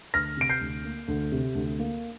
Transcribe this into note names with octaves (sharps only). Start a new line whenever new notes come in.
D2 F6 A#6
C3 D7
G6 C7
D2
A#3
D2
C3
D2
A#3